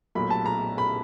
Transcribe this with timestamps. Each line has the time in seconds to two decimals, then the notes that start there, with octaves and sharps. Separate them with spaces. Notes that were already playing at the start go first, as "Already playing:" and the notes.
0.15 B1 A#2 F#3 A3 B5
0.30 A5
0.46 A#5
0.78 B5